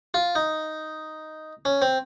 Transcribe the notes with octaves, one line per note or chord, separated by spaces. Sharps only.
F4
D#4
C#4
C4